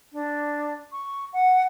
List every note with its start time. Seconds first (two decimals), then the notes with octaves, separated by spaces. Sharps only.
0.13 D4
0.92 C#6
1.33 F#5